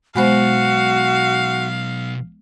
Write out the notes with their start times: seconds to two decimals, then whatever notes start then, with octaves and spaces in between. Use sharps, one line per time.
0.16 B1 B2 G#3 B3 F#4 C5 F5